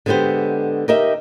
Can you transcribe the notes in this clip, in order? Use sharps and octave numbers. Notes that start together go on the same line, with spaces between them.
D3 G#3 B3 G4 C5
D#4 G4 A#4 D#5 E5